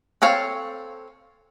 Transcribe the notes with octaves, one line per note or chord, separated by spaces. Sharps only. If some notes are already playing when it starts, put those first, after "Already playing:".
C4 A4 C#5 F5